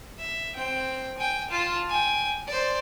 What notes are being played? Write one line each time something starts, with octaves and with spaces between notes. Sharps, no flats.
E5
C4 G5
G5 G#5
F4 A5
G5 G#5
C5 D5